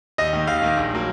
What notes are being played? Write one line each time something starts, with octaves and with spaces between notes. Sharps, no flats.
D#2 D#5
D#3 A#3
D#2 F5
D#3 A#3
A#1
F#3 A#3